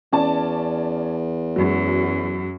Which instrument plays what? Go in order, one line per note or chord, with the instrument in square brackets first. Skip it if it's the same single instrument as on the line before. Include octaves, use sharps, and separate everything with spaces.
[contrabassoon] E2 [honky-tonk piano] C#4 D5 A5
[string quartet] F#2 [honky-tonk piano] F#3 G#3